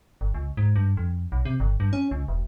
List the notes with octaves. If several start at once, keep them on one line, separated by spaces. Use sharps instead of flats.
G1
C#2
G#2
G2
F2
B1
C3
G1
G2
C#4
C#2
E1